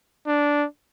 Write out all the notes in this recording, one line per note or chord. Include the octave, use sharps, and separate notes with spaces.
D4